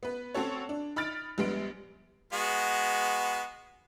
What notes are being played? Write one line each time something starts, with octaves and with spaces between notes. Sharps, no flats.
B3 B4
C4 C#4 F#4 A4 C#5
D4
D#4 B5 F6 A6 D7
A#1 G3 G#3 B3 D7
G#3 B3 F#4